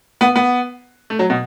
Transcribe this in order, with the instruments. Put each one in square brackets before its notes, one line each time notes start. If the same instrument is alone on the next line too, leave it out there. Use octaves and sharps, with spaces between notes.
[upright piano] B3
B3
A3
F#3
B2